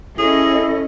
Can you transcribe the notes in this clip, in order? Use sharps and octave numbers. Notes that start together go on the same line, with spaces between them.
C#4 E4 G#4 A4 D#5